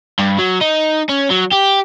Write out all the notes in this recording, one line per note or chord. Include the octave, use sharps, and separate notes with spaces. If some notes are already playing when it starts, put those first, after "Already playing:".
G2
F#3
D#4
C#4
F#3
G4